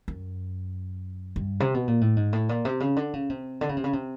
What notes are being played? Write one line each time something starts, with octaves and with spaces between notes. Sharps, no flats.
F#2
G2
C3
B2
A#2
A2
G#2
A2
A#2
C3
C#3
D3
C#3
C3
D3
C#3
C3
C#3
C3